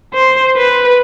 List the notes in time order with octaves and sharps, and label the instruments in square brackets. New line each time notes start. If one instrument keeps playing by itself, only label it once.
[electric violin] C5
B4